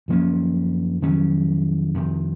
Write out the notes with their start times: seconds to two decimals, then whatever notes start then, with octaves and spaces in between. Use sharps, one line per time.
0.08 F#2 F3 A#3 C#4
1.02 F2 D#3 F#3 C#4
1.94 F2 C3 D#3